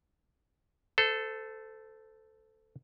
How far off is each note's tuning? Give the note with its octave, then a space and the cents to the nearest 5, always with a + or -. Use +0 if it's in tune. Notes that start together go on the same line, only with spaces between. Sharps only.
A4 +0 C5 -30